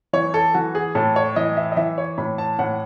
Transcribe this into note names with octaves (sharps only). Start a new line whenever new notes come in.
E3 C#5
A4
E3 F#4
G#4
A2 A4
C#5
E3 D#5
E5
D#5
E3 E5
C#5
A2 B5
A5
A2 F#5